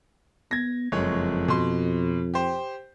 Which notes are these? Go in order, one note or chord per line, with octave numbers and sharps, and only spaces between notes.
B3 G#6 A#6
F#1 F2 G#3 C#5
B2 C6
G4 C5